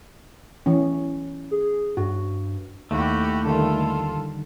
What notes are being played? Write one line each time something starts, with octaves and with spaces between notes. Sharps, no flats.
E3 C#4
G#4
G2 F#4
D#2 A3 E4 F#4 G4
D3 D#3 G3 F4 A4